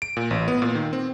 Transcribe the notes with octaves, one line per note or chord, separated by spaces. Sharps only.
D7
A#2
A1
B3
A#2
D#3
C4